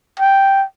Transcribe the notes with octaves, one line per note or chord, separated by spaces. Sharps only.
G5